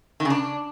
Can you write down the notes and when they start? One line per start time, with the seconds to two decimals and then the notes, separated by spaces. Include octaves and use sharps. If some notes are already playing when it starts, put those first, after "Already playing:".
0.20 D#3
0.25 C#3
0.30 D4